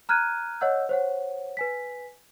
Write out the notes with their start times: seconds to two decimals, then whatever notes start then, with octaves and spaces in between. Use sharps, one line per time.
0.09 A#5 F6 F#6 G#6 D#7
0.61 C#5 D#5 F#5 E6 G6
0.89 C5 C#5 F#5
1.57 B4 G#5 B6